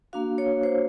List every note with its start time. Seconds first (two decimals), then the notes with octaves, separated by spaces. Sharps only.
0.13 A#3 D4 F#4 F5
0.38 C#5
0.63 C5